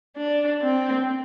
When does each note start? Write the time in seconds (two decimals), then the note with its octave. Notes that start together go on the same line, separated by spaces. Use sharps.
0.16 D4
0.62 C4